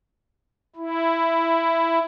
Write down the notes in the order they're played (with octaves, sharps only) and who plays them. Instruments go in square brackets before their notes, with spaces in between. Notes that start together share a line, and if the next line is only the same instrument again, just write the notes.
[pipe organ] E4